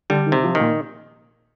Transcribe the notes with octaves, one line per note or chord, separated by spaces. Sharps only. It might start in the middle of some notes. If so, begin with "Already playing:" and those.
D3 G3
D#3
C3
F3
A#2 D#3